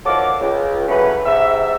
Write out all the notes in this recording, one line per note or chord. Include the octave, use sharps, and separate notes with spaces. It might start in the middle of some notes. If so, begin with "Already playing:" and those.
D#3 F3 F#4 A4 C#5 D6
C#2
C#3 E3 F#3 A3 C#4 B4
G#2 C3 E5 E6